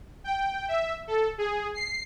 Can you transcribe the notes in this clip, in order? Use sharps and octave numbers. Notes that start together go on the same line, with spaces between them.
G5
E5
A4
G#4
C7